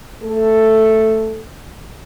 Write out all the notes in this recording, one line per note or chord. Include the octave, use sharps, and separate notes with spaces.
A3 A4